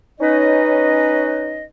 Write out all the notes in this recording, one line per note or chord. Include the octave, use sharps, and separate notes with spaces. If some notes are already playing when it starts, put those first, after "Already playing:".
C#4 D#4 B4 D#5